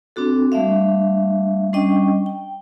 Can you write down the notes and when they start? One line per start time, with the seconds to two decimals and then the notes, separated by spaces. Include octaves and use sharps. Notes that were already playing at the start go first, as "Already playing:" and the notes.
0.16 C4 D4 F#4 A4
0.52 G3 A3 D4 E5 F5
1.73 G3 C#4 D4 D#5 G5 C#6
2.26 G5